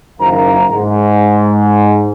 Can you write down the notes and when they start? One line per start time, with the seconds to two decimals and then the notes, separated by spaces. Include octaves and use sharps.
0.20 F#1 F#2 D#3 C5 F5 A#5
0.70 G#2